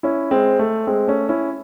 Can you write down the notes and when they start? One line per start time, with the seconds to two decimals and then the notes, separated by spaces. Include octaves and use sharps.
0.03 C#4 E4
0.31 G#3 C4
0.59 A3
0.87 G#3 C4
1.08 A3 C#4
1.29 C#4 E4